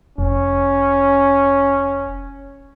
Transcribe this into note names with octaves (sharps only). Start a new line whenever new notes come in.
F1 C#4